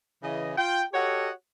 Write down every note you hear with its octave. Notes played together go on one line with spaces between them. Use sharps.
C#3 E3 D#5
F4 G5
F#4 G4 A4 C#5 D#5 F#5